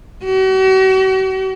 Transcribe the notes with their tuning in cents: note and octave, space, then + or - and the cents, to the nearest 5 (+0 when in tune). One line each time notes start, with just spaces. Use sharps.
F#4 +45